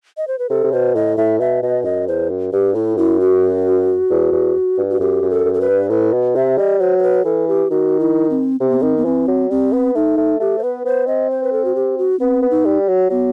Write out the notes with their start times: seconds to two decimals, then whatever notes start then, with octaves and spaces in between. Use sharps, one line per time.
0.17 D#5
0.28 C5
0.39 B4
0.50 C3 A4
0.64 C3
0.72 B2 C5
0.95 A2 D#5
1.17 A2 E5
1.40 B2 E5
1.63 B2 D#5
1.84 F#2 D#5
2.08 E2 C5
2.30 F#2
2.53 G2 G4
2.74 A2 E4
2.97 F#2 E4
3.20 F#4
4.10 E2
4.33 E2
4.78 G2
4.90 F#4
5.00 F#2 G4
5.22 F#2
5.30 A4
5.45 F#2
5.54 A4
5.61 B4
5.68 G2
5.90 A2 B4
6.13 B2
6.35 C3 E5
6.58 G3 D#5
6.80 F#3 C5
6.98 C5
7.03 B4
7.25 E3 A4
7.48 G4
7.71 D#3 F#4
8.00 E4
8.30 C4
8.60 C3 C4
8.69 B3
8.79 D#3 C4
8.97 B3
9.05 E3 C4
9.28 F#3
9.50 G3 C4
9.72 B3
9.95 A3 D#4
10.17 A3
10.40 A3 G4
10.58 C5
10.63 B3 B4
10.85 B3 C5
11.07 C4 D#5
11.31 C5
11.44 B4
11.52 A4
11.65 F#4
11.75 G4
11.98 F#4
12.20 B3 C4
12.42 B3
12.51 D#4
12.65 G3
12.88 F#3
13.10 F#3 B3